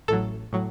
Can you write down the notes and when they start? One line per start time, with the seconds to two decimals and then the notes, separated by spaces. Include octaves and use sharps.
0.08 A1 A2 F#3 A4
0.53 A2 F#3